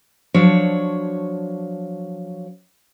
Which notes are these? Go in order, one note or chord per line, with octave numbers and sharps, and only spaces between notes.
F3 F#3 D4 C#5